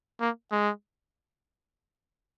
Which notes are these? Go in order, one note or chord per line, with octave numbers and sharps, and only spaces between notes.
A#3
G#3